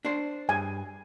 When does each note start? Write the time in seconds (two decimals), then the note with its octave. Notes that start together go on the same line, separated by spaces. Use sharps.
0.05 D4 C5
0.49 G2 G#5